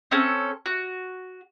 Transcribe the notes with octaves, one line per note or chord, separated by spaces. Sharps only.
C4 C#4 A4
F#4